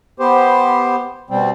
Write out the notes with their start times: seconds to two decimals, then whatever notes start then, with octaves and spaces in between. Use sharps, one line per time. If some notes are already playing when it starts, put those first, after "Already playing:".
0.20 B3 G4 C5
1.30 B2 G3 C4